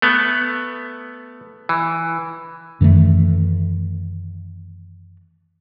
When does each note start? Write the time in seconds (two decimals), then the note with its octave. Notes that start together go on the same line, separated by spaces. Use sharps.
0.02 A3 B3
1.69 E3
2.81 F#2 D#3 E3 A3